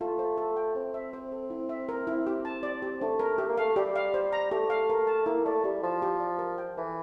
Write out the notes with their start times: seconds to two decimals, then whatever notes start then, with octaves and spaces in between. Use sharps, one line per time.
0.01 A3 F4
0.19 C5
0.37 A4
0.57 G5
0.75 C4 A4
0.94 E5
1.13 C5
1.32 A4
1.50 E4
1.69 E5
1.89 A#4
2.07 E4
2.27 G4
2.45 A5
2.63 D5
2.82 G4
3.01 A3 D4
3.20 A#4
3.38 A3 G4
3.49 A#3
3.58 A3 F5
3.76 G3 G4
3.96 F5
4.14 C5
4.33 A#5
4.51 A3 G4
4.70 F5
4.90 A#4
5.07 A5
5.26 A#3 E4
5.45 A3 D5
5.64 G3 G4
5.83 F3 A5
6.02 G4
6.20 D5
6.39 A#4
6.58 G5
6.77 E3 A4